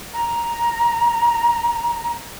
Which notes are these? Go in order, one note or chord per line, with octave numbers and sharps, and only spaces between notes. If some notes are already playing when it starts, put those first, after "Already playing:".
A#5